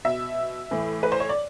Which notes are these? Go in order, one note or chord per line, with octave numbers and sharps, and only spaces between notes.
B2 E5
A2 E3
B4
C5
C#5
D5